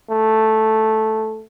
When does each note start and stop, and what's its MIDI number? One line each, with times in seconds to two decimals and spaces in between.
0.11 1.43 57